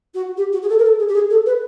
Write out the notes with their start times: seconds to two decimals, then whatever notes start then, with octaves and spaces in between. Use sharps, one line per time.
0.14 F#4
0.37 G4
0.52 F#4
0.62 G#4
0.69 A4
0.78 A#4
0.84 A4
0.98 G#4
1.07 G4
1.14 G#4
1.30 A4
1.46 B4